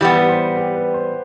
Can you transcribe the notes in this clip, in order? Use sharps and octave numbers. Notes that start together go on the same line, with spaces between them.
E3 G3 B3 G4
B4
C5
G4
B4
C5